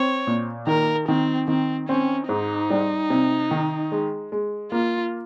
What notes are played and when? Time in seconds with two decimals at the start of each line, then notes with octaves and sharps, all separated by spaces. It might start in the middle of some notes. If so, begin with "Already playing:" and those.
Already playing: C4 C#5
0.27 A#2
0.67 D#3 A#4
1.08 D#3 C4
1.48 D#3 C4
1.88 C4 C#4
2.29 G#2 D#4
2.70 G3
3.10 C3
3.51 D#3
3.92 G#3
4.32 G#3
4.72 A#3 F4